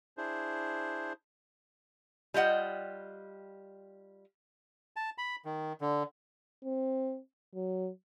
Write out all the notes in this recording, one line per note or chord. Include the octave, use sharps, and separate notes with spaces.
D4 E4 G#4 C5
G3 F4 D#5 F#5
A5
B5
D#3
D3
C4
F#3